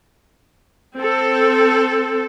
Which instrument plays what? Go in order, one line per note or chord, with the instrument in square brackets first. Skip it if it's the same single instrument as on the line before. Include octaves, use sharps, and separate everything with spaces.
[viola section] C4 A4